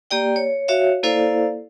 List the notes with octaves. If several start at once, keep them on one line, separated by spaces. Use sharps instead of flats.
A#3 G4 D5 G5
C#5
F#4 C#5 E5 F5
A#3 E4 A4 C5 D5 F5